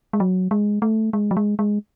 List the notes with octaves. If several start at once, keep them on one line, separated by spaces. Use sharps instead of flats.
G#3
F#3
G#3
A3
G#3
F#3
G#3
G#3